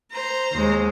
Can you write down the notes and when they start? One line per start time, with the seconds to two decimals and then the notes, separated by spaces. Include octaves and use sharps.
0.11 C5 A#5
0.52 D#2 G#3